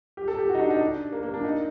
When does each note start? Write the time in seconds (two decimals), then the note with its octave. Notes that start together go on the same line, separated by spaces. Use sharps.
0.17 G4
0.28 A4
0.38 G4
0.49 F#4
0.55 D#4
0.59 D4
0.70 D#4
0.81 D4
1.12 A#3
1.23 A#3
1.34 D4
1.44 D#4